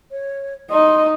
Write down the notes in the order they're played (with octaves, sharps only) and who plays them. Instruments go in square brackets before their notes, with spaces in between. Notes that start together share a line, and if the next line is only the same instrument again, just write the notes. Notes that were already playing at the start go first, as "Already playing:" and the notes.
[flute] C#5
[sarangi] D#4 [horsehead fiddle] D#5 [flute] C6